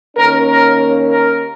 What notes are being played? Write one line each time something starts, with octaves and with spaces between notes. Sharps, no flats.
D#2 D#3 A#3 C#4 A#4
A#4
A#4